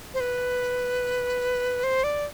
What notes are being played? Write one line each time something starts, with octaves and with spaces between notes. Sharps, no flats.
C5
B4
C5
D5